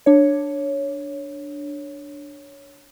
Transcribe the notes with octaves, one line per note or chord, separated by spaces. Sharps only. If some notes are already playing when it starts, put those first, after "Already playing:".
D4 C#5